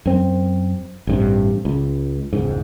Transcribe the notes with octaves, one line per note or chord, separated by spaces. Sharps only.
F#2 C4
A1 G2 C3
C#2
E1 C#2 G#2